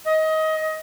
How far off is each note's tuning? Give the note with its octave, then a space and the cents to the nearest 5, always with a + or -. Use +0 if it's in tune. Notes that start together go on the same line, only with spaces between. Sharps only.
D#5 +20